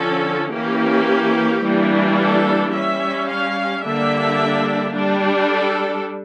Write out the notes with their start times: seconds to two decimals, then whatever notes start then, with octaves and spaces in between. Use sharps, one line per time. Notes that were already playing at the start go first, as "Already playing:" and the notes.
Already playing: D3 F3 C#4 A4
0.52 E3 A#3 C#4 G4
1.63 E3 G3 A#3 D4
2.18 A4
2.73 G3 C#4 E5
3.29 F5
3.84 D3 G3 A#3 D4 E5
4.94 G3 D4
5.50 A4